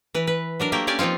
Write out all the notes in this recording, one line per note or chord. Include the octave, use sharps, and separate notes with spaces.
E3 B4
B4
F#3 D4 A#4
A3 A#3 G4 A#4
C#4 G4 D5 G#5
F3 A#3 C4 D#4 F4